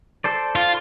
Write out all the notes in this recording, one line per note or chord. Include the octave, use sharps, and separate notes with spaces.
A4 C5 D5
F4